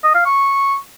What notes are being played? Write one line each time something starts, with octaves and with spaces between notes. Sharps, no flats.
D#5
F5
C#6